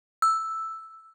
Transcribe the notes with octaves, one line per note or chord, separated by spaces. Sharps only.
E6